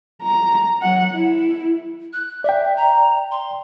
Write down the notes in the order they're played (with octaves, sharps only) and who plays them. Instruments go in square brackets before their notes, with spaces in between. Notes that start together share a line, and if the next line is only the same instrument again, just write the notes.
[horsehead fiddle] A#5
F#3 F#5
E4
[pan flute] F#6
[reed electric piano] D5 G5 [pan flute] E5
[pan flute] A#5
C6